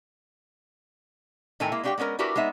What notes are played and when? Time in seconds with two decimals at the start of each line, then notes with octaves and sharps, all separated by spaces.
1.60 A2 D#3 A4 G5 G#5 A#5
1.72 G#3 A#3 E4
1.84 G#3 D4 F#4 G4 F5 G5
1.98 G#3 B3 C#4 G4 A#4
2.19 D4 E4 F#4 G4 A#4 B4
2.36 G#3 B3 D#4 E5